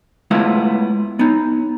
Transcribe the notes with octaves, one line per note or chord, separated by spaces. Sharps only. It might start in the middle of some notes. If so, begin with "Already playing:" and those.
G#3 A3 B3 E4 F4 F5
B3 D#4